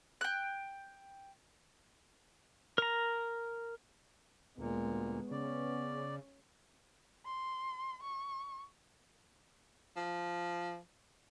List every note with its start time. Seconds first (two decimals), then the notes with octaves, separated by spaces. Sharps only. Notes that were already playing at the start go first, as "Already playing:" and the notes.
0.21 G5 F#6
2.78 A#4 A#5
4.58 D2 A#2 G#3 B3
5.31 C#3 C#4 D5
7.26 C6
8.03 C#6
9.96 F3